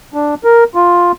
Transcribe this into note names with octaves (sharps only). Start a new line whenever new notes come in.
D4
A#4
F4